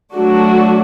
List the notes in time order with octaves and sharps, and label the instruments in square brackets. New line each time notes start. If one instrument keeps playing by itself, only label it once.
[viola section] F#3 A3 D4 F#4